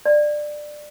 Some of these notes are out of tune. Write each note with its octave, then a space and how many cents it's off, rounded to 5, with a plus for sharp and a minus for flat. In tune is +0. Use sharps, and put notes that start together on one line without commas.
D5 +15